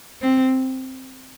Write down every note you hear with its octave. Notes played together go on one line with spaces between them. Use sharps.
C4